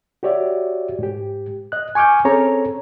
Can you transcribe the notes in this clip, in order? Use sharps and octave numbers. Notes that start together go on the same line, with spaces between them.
F#4 G4 C#5 D5 E5
G#2 G4
D#5 F#6
G#5 C#6 D6 F6 G6
C4 C#4 G#4 A4 C#5 A#5